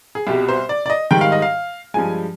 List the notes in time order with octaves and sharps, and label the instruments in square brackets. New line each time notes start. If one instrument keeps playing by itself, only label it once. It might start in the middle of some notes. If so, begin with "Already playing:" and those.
[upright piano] G#4
C2 B2 G3 G4
C5
D5
D5
D#5
G#2 D#3 G3 G5
F5
D#5
F5
G2 F3 G#3 G#5